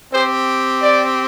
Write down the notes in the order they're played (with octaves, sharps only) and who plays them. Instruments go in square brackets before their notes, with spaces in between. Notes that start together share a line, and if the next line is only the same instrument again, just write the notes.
[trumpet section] C4 G4 C5
D5